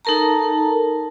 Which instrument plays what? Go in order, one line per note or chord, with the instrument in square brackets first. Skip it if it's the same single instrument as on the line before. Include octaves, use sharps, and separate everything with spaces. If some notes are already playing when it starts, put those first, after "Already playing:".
[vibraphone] D#4 A4 A#4 A5 A#5